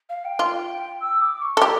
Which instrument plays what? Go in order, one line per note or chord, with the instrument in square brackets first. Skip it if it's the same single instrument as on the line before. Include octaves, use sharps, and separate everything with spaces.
[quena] F5
G5
[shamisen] F4
[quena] E6
D6
C#6
[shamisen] A4
[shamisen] G4 [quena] A#5